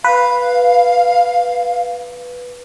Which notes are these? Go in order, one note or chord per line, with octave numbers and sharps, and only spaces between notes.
B4 F5